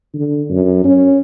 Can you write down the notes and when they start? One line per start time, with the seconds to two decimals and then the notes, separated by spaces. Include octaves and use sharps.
0.14 D3
0.50 F#2
0.84 C#4